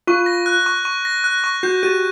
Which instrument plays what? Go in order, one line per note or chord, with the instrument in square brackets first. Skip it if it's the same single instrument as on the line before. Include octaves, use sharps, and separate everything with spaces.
[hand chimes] F4 [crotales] C#6
[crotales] A#6
F#6
C#6
C#6
A#6
F#6
C#6
[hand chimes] F#4 [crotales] G6
[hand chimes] G4 [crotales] D#7